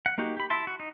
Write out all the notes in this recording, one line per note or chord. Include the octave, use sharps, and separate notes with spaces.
F#5
A#3 D#4 F#4 G4
G4 B5
E4 E5 A5 C6
F#4
D#4